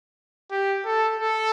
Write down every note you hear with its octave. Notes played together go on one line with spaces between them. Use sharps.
G4
A4
A4